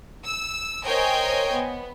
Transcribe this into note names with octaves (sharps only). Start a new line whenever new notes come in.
E6
A#4 C5 C#5 D#5 G5 G#5
B3